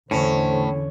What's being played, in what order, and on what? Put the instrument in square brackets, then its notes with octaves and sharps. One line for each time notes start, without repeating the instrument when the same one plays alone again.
[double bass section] E2 D3 [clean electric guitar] A2 [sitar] C#4 [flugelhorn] C5